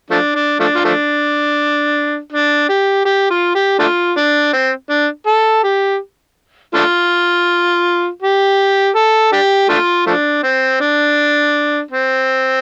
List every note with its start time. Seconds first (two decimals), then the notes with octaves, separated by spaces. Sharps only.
0.10 F3 A3 D4
0.35 D4
0.60 F3 A3 D4
0.75 F4
0.84 F3 A3 D4
2.32 D4
2.69 G4
3.05 G4
3.30 F4
3.55 G4
3.79 A3 D4 F4
4.17 D4
4.53 C4
4.90 D4
5.27 A4
5.64 G4
6.75 A3 D4 F4
8.22 G4
8.95 A4
9.32 D4 G4
9.69 A3 D4 F4
10.06 F3 A3 D4
10.44 C4
10.81 D4
11.91 C4